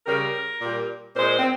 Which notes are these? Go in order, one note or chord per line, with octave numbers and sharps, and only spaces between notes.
C#3 G3 A#4
A#2 G3
A#2 G#3 C5
C4